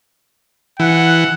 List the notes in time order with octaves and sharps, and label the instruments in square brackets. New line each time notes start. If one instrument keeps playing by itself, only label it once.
[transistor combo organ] E3 [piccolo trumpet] F#5